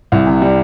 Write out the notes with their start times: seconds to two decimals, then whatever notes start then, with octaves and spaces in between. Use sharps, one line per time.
0.12 C2
0.27 C3
0.42 G3